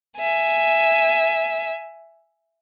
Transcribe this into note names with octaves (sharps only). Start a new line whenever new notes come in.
E5 G#5